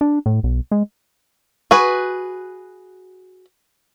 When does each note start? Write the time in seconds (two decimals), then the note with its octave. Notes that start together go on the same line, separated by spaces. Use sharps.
0.01 D4
0.26 A2
0.43 B1
0.71 G#3
1.71 F#4 G#4 B4